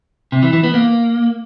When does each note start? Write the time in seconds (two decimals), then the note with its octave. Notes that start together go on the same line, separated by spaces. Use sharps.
0.32 C3
0.43 E3
0.53 E3
0.63 B3
0.74 A#3